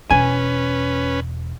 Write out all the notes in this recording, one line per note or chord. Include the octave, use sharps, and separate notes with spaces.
E1 C#4 B4 G#5